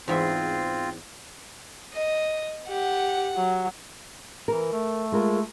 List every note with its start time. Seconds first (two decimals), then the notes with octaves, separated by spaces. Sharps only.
0.08 E2 G#2 C4 F4 E5
1.93 D#5
2.69 G4 F#5
3.36 F#3
4.48 E3 A#4
4.72 A3
5.12 G#3 F4 A#4